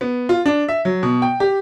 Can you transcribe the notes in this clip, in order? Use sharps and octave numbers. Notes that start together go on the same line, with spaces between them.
B3
F4
D4
E5
F#3
B2
G5
G4